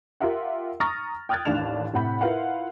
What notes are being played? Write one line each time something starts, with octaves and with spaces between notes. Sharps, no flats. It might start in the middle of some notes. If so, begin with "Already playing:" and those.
F4 G4 A#4 E5 F#5
A#5 C#6 D#6 F6 A6 A#6
G5 D#6 F6 F#6 G#6 A6
A1 D#2 A2 D4 E7 F7
A2 C3 F#5 B5 G6
E4 F4 A#4 B4 F5 F#5